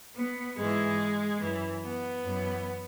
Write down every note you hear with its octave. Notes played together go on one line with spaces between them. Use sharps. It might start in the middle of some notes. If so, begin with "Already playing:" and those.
B3
G#2 E3 G#3
F#2 E3
B3
F#2 E3